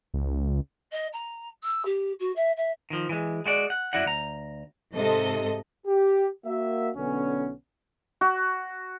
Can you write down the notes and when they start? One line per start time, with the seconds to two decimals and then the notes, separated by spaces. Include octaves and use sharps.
0.14 C#2
0.92 D#5
1.12 A#5
1.63 E6
1.85 G4
2.19 F#4
2.35 E5
2.56 E5
2.90 D#3 F3
3.09 E3 G#3
3.46 G#3 F#4 D5
3.70 F#5
3.93 F#2 E4 F#4 D5 F#5
4.05 D2 A#5
4.94 G#2 C3 A4 D#5
5.87 G4
6.46 A#3 F#4 E5
6.96 B1 D3 B3 C#4
8.21 F#4